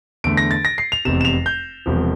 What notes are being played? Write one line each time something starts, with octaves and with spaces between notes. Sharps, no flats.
E2 D3 A3 D7
A#6
A6
A#6
C7
F7
F1 E2 C3 E7
E7
F7
G6
E1 E2 C3 F3